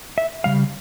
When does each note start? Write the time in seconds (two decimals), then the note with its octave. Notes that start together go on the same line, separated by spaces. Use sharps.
0.18 E5
0.44 C#3 G3 F5